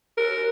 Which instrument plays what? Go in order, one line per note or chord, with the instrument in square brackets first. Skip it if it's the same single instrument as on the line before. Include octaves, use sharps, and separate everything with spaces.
[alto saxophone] A#4